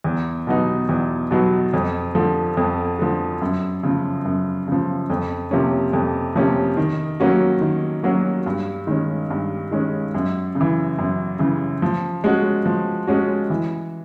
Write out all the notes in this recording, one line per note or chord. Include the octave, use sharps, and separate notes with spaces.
E2
B2 F#3 B3 D#4
E2
B2 F#3 B3 D#4
F2
D3 F3
F2
D3 F3
F#2
C#3 F3
F#2
C#3 F3
F2
C3 F3 A#3 C#4
F2
C3 F3 A#3 C#4
D#3
F#3 A#3 C#4 F#4
D#3
F#3 A#3 C#4 F#4
G2
D#3 G#3 C#4
G2
D#3 G#3 C#4
F#2
C#3
E3
F#2
C#3 E3
F3
G#3 C#4 F#4
F3
G#3 C#4 F#4
E3